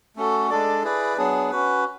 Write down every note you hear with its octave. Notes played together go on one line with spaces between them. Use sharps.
A3 C#4 F#4 A4
G#3 D4 A4 D5
E4 G#4 B4 D5
F#3 B3 D4 G#4
C#4 F#4 B4